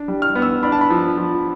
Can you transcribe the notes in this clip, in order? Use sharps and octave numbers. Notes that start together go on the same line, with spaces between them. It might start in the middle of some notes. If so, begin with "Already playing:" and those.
Already playing: D4
G3
F6
B3
E6
D4 B5
A5
B5
F3
F3